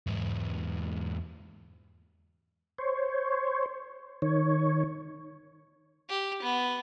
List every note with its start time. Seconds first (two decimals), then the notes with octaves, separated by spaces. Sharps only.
0.07 E2 G#2
2.78 C5 C#5
4.22 D#3 C#5
6.09 G4
6.42 B3